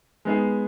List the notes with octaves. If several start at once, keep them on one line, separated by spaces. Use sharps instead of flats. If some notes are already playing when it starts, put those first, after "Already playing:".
G#3 B3 D#4 G#4